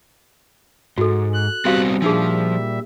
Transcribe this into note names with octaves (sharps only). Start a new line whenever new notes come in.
G#2 F#4 A4
F#6
G3 B3 C4 F#4 G4 F5
A#2 F3 G3 D4 D#4 G#4 E5